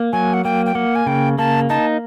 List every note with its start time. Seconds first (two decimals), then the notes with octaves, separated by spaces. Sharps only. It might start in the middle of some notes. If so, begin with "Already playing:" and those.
Already playing: A#3
0.13 F#3 G#5
0.34 F#5
0.44 A#3 G5
0.66 G5
0.75 A#3 F#5
0.95 G#5
1.06 C#3 G5
1.38 A#3 A5
1.69 D#4 A5